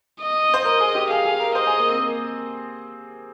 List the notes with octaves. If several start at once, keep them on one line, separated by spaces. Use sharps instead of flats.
D#5
C5
A#4 D#5
G#4
G4
G#4 F5
G#4
A#4
C5 D#5
G#4
A#3
C4
A#3